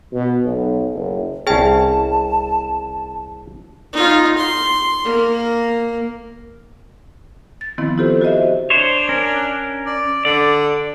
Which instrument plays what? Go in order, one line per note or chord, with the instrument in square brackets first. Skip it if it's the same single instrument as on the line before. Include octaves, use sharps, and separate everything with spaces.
[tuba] B2
B1
F#1
[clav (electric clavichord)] C2 C#4 [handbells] G#4 G5 [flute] A5
[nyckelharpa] D#4 F4
C6
A#3
[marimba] A6
D#3 F3 B3 C4 E4
E4 F4 G4 A4 C5
F#4 G4 C5 D#5 E5
[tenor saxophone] D4 [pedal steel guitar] C5 C#5
[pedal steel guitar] C#4 A#4
[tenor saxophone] D5
[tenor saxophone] D3 [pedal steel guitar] D5